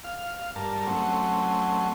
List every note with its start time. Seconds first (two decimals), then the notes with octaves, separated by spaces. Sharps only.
0.04 F5
0.56 G2 A#4 A5
0.87 F#3 A3 C4 C#4